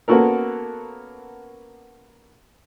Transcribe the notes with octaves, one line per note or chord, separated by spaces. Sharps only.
A#3 B3 C#4 F#4 A4 A#4